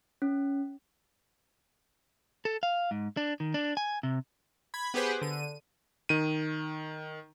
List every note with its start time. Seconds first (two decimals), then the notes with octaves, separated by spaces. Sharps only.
0.22 C#4
2.45 A4
2.63 F5
2.91 G#2
3.17 D4
3.40 D#3
3.54 D4
3.77 G#5
4.03 C3
4.74 B5 G#6
4.94 B3 G4 G#4 B4 C5
5.22 D3 D#7
6.09 D#3 D#7